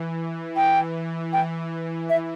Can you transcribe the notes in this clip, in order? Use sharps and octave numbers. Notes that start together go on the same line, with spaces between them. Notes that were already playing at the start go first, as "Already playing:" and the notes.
Already playing: E3
E3 G5
E3 G5
E5